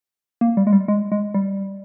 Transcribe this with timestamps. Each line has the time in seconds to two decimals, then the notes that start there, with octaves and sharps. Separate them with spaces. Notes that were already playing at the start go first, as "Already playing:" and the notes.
0.41 A#3
0.57 G3
0.67 G#3
0.73 G3
0.88 G#3
1.12 G#3
1.34 G3